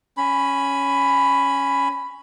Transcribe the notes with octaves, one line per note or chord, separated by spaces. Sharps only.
C#4 B5